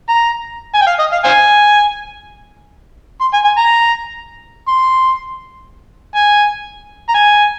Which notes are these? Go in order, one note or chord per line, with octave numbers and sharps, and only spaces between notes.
A#5
G#5
G5
F5
D#5
F5
C5 F5 G#5
C6
G#5
G#5
A#5
C6
G#5
A#5
G#5